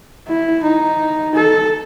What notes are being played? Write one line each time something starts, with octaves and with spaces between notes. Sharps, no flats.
E4
D#4
A4